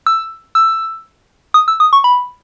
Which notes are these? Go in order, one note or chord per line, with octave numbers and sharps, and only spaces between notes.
E6
E6
D#6
E6
D#6
C#6
B5